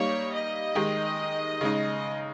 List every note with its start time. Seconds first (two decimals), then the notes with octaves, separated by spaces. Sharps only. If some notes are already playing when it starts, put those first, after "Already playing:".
Already playing: G3 A#3 D#4 C#5
0.34 D#5
0.75 D#3 G#3 D#4 G4
1.61 C#3 G#3 D#4